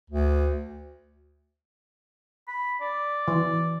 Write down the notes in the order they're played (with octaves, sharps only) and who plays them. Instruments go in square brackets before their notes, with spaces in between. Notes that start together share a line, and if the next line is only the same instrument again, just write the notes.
[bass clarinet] D2
[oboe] B5
D5
[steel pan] E3